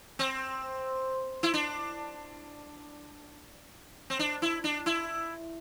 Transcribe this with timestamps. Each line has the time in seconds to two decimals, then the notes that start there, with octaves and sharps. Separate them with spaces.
0.19 C4
1.43 E4
1.54 D4
4.10 C4
4.19 D4
4.42 E4
4.64 D4
4.86 E4